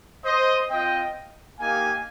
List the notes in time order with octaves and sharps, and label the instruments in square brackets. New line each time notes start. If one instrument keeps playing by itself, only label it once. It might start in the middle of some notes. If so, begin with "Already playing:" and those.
[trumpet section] C5 D#5
C4 F4 D#5 G5
A#3 D#4 G4 F5 G#5